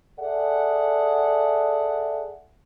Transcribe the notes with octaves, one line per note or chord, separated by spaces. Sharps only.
G#4 A4 D5 E5 F#5